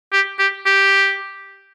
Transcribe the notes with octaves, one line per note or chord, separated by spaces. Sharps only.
G4
G4
G4